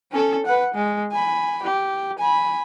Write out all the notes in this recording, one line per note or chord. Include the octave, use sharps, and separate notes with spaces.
C#4 A4
B4 F#5
G#3
G#5 B5
G4
G#5 B5